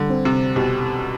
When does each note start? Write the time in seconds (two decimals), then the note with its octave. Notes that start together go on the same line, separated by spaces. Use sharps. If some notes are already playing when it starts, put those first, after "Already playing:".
Already playing: D3 G3
0.09 C4
0.25 C3
0.56 B2 G4